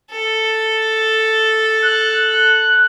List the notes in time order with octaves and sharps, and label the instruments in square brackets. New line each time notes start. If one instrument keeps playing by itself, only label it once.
[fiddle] A4
[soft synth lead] F#6